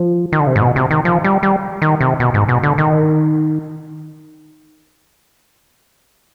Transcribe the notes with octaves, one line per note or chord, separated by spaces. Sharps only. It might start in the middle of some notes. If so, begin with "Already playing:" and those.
Already playing: F3
D#3
D3
C3
G#2
B2
C3
D#3
F3
G3
G3
D#3
C3
B2
G#2
B2
D3
D#3